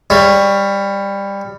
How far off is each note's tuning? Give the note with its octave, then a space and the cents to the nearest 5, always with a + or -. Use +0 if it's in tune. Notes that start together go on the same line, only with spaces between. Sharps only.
G3 +20 C#5 +0